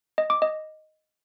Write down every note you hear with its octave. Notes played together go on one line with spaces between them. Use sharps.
D#5
D6
D#5